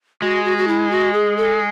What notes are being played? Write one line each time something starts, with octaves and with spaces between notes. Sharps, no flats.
G#3 F#4
F#4
F#4
E4
F#4
G#4
A4